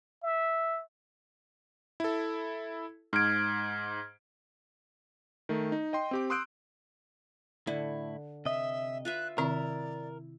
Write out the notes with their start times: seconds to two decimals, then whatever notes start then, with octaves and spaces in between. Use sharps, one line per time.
0.24 E5
2.00 E4 A4
3.13 G#2 F6 G#6 D7
5.49 D#3 A3
5.72 D#4
5.93 D#5 G5 C6
6.11 C4 G4 D6
6.30 C6 D#6 E6 F#6 G6 D7
7.67 A2 D3 E4
8.46 C3 D#5 E5
9.05 F4 B4 E5 F#6
9.38 C3 D#3 C4 E4 A#4 D5